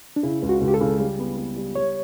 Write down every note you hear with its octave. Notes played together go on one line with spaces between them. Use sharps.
D4
C#3 E4
C#2
F#4
C#2
G4
A4
C#3
G3
B3
B3
G3
G3 C#5